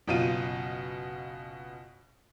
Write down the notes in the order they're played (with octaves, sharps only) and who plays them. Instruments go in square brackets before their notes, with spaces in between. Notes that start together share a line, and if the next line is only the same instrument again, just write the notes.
[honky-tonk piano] F#1 B2 F4 D#7